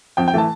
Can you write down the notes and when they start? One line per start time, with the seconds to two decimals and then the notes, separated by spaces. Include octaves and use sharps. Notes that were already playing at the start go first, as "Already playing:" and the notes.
0.17 F2 G5
0.28 G5
0.34 E3 A3 A5